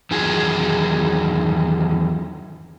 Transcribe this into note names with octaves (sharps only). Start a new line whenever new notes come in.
E2 D#3 F#3 F4 G#4 G#5